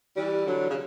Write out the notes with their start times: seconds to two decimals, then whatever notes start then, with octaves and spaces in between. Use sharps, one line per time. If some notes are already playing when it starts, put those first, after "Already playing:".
0.16 E3 G3
0.46 D3 F#3
0.70 C#3